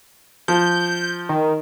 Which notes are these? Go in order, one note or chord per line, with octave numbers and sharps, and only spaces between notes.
F3 G6
D#3